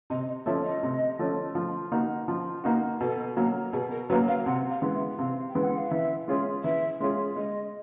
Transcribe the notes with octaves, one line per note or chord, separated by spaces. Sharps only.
C3 D#5
D#5
F3 A3 C#4 E5
D#5
C3
F3 A3 C#4
F3
A#3 D#4 F#4
F3
A#3 D#4 F#4
B2 A4
F#3 A#3
B2 G#4
A#4
F#3 A#3 B4
F5
C3 F#5
F5
E3 G#3 B3
E5
C3 F5
G5
E3 G#3 B3
F#5
F5
E3 E5
G#3 C#4 F4 G#4
E3 E5
G#3 C#4 F4 G#4
G#3 D#5